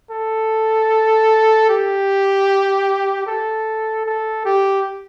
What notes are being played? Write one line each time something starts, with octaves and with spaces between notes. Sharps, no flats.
A4
G4
A4
A4
G4